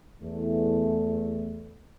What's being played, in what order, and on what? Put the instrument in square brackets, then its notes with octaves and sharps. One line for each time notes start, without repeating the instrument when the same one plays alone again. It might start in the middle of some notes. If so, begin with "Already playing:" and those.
[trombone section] E2 A3